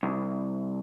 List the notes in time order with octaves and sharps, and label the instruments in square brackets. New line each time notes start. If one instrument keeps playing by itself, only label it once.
[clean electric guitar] C2